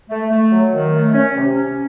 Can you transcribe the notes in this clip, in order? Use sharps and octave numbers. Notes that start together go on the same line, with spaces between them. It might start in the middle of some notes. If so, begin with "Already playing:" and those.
A3
A3
F#3
D#3
A3
C#4
C3
C#4